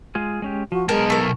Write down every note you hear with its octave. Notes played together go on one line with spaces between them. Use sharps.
G#3 F4 G#4
G#3 C#4 G4
F3 F#4
B1 B2 G#3 A#4 A5
A3 A#4